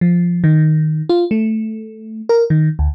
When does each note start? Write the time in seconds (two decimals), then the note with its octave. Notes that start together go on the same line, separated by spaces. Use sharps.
0.01 F3
0.44 D#3
1.09 F4
1.31 A3
2.29 A#4
2.50 D#3
2.79 D2